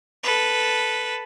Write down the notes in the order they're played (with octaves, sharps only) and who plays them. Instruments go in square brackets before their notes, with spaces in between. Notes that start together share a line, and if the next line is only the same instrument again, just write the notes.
[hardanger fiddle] A4 B4